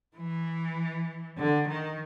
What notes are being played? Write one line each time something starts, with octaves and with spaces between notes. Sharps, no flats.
E3
D3
D#3